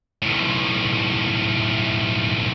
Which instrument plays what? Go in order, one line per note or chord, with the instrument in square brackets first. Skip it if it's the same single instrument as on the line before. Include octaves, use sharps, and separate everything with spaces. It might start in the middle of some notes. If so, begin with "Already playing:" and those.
[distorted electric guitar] B1 A2